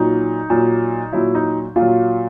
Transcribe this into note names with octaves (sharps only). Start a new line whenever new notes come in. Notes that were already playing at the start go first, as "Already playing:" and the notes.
Already playing: A#2 F#3 D#4
A#2 F#3
A#2 F#3 E4
D#4
A#2 F#3 F4